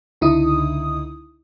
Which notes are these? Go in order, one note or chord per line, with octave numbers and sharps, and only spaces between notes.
C#2 D3 D#4 E4 D#6